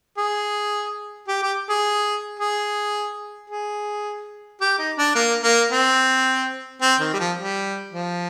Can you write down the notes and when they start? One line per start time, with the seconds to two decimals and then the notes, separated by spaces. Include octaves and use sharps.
0.17 G#4
1.28 G4
1.42 G4
1.69 G#4
2.39 G#4
3.50 G#4
4.61 G4
4.79 D#4
4.98 D4
5.15 A#3
5.43 A#3
5.71 C4
6.82 C4
7.00 D#3
7.13 G3
7.19 F3
7.38 G3
7.93 F3